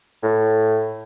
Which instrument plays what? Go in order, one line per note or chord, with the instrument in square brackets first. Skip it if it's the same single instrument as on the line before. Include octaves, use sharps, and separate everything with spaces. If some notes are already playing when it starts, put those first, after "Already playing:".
[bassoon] A2